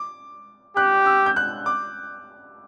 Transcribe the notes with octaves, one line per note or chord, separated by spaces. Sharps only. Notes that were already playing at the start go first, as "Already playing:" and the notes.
Already playing: D6
G4 F#6
E6
G6
F#6
D6